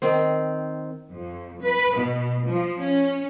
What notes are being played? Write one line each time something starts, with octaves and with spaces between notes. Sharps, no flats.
D#3 C4 C5
F2
B4
B2
F3
C#4